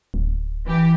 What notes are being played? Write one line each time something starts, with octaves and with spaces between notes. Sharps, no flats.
D1
E3 G4